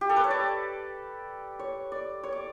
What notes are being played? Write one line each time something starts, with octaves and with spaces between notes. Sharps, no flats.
G4
A4
B4
C#5
D5
C#5
D5
C#5
D5